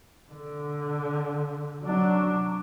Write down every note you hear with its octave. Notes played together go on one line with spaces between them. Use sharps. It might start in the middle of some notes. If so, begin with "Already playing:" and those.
D3
F#3 D4